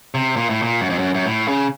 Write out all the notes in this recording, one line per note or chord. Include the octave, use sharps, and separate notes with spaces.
C3
A#2
A2
A#2
F#2
F2
F#2
F#2
A2
C#3